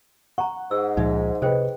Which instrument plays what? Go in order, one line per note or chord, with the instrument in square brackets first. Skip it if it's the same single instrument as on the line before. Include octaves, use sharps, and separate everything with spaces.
[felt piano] F#5 [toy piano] A#5 C#6
[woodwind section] G#2 [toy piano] E6
[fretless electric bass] C#2 A#2 F3 [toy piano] D#4 E5
[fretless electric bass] C3 [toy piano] G#4 C5 G5 [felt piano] B4 D#5